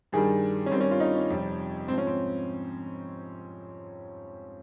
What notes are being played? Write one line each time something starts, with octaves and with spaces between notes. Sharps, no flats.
G2 D#3 G3 G#4
C#4
G2 D#3 G3 C4
C#4
F4
D#4
C#4
F2 C3 G3
G#2 F3 C4 C#4
C4